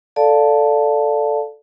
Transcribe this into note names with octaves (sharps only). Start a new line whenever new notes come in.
A4 D5 F5 A5